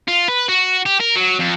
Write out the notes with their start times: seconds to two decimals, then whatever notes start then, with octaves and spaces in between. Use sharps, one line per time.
0.08 F4
0.28 B4
0.48 F#4
0.86 G4
1.00 A#4
1.16 F#3
1.40 F2